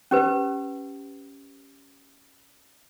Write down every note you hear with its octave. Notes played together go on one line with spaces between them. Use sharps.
C#4 G4 B4